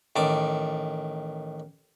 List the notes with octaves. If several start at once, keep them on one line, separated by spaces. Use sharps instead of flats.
A1 D#3 A5 D6